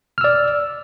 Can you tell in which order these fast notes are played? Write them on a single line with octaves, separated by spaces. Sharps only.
F6 E6 D5